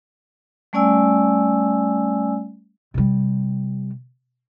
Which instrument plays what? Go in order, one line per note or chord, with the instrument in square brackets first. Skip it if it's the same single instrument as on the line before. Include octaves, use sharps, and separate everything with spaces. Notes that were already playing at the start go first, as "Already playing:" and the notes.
[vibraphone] G3 A3 C#4 D5 G#5 E6
[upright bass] C3 G3